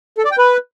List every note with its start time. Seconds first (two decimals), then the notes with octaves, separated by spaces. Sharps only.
0.18 A4
0.25 D5
0.32 G5
0.38 B4